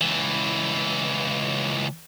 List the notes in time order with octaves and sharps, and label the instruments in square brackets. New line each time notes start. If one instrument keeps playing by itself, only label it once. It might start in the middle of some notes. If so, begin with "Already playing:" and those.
[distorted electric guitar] C#2 E3